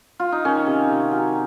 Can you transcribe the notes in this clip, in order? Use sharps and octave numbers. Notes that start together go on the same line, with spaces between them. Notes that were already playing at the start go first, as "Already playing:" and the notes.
F4
D#4
D#3 C#4
C3
C3
F#3